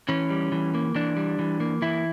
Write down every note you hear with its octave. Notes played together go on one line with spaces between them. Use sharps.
E3 C#4
G3
E3
A#3
E3 D4
G3
E3
A#3
E3 E4